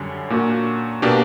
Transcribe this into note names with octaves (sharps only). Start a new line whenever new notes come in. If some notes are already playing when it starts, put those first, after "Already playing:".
Already playing: F#2 D3 G3 C#4
A#2 A#3 D4 F#4
B2 A#3 D4 G4